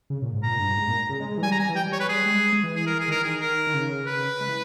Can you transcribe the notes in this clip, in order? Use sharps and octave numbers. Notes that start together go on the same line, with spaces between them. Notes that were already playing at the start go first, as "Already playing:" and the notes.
C#3
A#2
G#2
A#2 A#5
G2
G#2
A#2
C#3
G#3
G#3
E3
G3 G#5
A#5
G3 G#5
E3
G3 G5
G3 C#5
B4
G3 G#4
G#3
G#3
E3
G#4
A#4
G#4
D#3 A#4
G#4
A#4
D#3
C#3
B4
G#3
E3